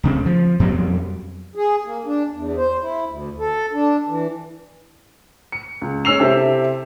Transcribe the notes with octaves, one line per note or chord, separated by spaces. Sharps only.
D1 C#3 C4
F3
F2 B2 F#3 G3
G#4
A#3
D4
E2
C5
E4
D2
A4
D4
E3
C#7
C#2
G#3 C#4 E6 C7 F7
C3 C4 E4 G4 A4